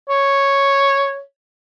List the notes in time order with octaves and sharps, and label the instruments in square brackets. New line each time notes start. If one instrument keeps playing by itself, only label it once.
[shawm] C#5